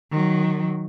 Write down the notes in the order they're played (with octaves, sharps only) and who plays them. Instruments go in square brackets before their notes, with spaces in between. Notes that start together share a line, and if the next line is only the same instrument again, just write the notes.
[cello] D#3 F#3